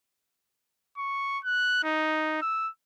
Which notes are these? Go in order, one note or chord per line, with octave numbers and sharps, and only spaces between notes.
C#6
F#6
D#4
E6